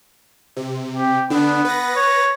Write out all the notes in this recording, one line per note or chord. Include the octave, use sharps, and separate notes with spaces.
C3
G4
D3 B3 D4
B4 A#6
C#5